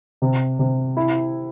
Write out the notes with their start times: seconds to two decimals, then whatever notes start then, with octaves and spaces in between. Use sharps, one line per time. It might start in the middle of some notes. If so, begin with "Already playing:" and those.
0.22 C3
0.59 C3
0.97 E4